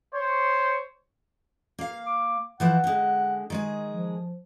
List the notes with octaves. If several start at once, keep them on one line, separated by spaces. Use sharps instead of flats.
C5 C#5
A#3 F5
D6
E3 F3 E4 F#5
D3 G#3
D#3 G#3 G#4
F3